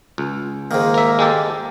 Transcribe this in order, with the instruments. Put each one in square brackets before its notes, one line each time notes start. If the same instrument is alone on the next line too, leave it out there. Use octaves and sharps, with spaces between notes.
[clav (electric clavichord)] C#2
[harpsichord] G#2 D#3 [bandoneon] A#3
[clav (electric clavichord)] A#4 E5
G#3 G4 A4